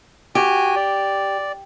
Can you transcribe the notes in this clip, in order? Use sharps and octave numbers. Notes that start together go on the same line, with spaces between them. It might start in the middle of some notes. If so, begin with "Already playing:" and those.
F#4 G4 G#5
D5